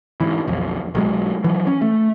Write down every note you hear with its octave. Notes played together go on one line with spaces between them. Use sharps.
G#2 E3
B1 F2
B1 F#3 G#3
E3 F#3
C#4
A3